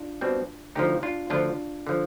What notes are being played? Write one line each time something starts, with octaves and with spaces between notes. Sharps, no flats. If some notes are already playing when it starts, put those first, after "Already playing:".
Already playing: D4 F4
B2 G3 C4
D2 D3 F3 D#4 G4
D4 F4
D2 D3 F3 D4 F4
D3 F3